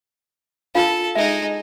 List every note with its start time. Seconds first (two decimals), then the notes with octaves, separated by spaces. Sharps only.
0.75 D4 F4 A4 F5
1.15 G#3 D#4 E5